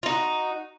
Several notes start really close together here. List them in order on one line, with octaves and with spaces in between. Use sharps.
F4 D#4 F#4